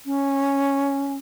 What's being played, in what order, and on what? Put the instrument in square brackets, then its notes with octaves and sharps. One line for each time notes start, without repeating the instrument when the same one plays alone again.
[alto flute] C#4